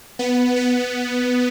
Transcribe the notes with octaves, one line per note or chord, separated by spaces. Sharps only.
B3
B3